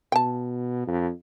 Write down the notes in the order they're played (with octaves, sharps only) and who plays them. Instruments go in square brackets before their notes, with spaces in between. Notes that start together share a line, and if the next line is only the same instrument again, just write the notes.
[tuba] B2 [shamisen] G5 A5
[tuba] F2